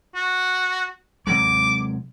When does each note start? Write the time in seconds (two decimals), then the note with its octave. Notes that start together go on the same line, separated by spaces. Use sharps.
0.15 F#4
1.27 C3 F#3 G#3 D6